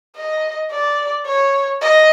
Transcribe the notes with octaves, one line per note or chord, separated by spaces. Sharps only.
D#5
D5
C#5
D#5